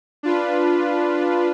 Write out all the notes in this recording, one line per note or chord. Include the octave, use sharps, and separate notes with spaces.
D4 F4 B4